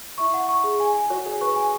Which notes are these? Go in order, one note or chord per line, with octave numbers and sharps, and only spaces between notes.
E4 C#6
F#5
C#6
G#4
G#5
G#5
F#4 C#5
G#4 C#5
B4 C#6
G#5